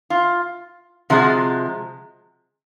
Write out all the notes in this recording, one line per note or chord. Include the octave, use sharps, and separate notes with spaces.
F4
C3 F3 G#3 F#4